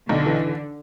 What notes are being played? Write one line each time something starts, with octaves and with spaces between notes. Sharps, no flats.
B1 D3
E3